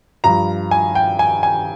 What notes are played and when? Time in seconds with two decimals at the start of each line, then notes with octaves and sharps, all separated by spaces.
0.24 G2 F3 A#5
0.71 G#5
0.95 G5
1.19 G#5
1.43 G#5